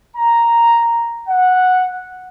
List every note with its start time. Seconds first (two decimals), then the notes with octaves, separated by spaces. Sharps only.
0.16 A#5
1.28 F#5